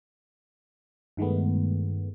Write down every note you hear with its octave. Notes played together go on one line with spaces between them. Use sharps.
G2 D#3 G#3 A3 B3